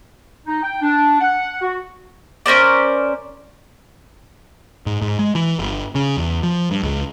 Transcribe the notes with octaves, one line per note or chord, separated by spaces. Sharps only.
D#4
G5
D4
F#5
F#4
C#4 A#4 C5 D5
G#2
G#2
G#3
E3
G1
C#3
E2
F3
G2
C#2